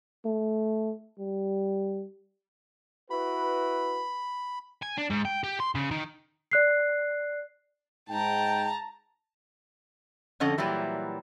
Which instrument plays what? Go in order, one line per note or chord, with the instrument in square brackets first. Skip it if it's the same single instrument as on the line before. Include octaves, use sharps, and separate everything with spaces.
[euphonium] A3
G3
[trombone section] E4 F#4 B4 [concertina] B5
[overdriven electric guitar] G#5
D4
G#2
G5
G4
C6
C#3
D#3
[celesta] D5 F#6 C7
[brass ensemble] G#2 G5 [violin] A5 A#5
[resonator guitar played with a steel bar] F2 D3 C#4 A4 D#5 F#5
A#2 E3 F#3 G3 E4